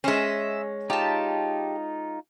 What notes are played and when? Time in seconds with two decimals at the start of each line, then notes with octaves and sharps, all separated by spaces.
0.04 G#3 C#4 C5 D#5 E5
0.90 D#4 F4 G4 A5